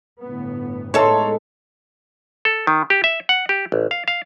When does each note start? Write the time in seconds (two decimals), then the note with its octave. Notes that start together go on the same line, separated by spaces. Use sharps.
0.23 G1 A2 B3
0.94 A2 G#3 B3 D#4 A4 C#5 A5 C6
2.45 A4
2.67 D#3
2.90 G4
3.04 E5
3.29 F#5
3.49 G4
3.72 A1
3.91 F5
4.08 F5